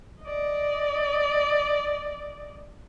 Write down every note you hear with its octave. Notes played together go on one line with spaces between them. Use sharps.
D5 D#5